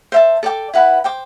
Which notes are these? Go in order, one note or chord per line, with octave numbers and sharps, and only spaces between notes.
C5 E5 A5
A4 D5 G5 D6
E4 B4 F#5 B5
C5 G5 D6